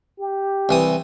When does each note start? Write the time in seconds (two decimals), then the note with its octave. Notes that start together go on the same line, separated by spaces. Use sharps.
0.19 G4
0.69 C2 E3 D#6